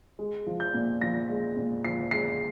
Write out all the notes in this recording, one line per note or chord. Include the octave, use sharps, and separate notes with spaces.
G#3
F3
G6
A#2
F3 A#6
G#3
A#2
F3 C7
G#3 C7